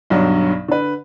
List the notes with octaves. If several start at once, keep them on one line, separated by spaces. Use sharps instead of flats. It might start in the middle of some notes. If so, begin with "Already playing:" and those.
B1 G2 D3 F#3
D3 B4